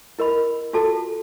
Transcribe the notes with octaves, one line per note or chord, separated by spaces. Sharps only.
E4 A#4 D#5 B5
F4 F#4 A4 A5